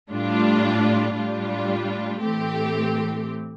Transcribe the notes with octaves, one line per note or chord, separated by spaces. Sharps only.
A2 G3 D4 F4
A2 G3 D4 F4
A2 E3 A3 C4 G4